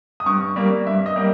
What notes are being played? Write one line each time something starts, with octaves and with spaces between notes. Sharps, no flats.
D#6
G2 C#6
G3 A#3
G2 E5
D#5
G3 A#3